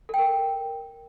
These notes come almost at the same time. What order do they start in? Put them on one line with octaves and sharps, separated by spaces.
A4 G5 A#4